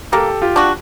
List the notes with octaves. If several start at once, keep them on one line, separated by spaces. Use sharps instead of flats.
A#3 G4 A4
F4 G4
D4 F#4